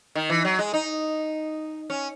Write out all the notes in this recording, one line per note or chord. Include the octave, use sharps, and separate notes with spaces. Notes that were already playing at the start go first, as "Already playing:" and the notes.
D#3
E3
F#3
G#3
D#4
C#4